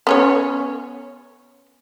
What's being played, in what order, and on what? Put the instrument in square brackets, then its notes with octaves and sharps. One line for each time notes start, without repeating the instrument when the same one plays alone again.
[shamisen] B3 C#4 C#5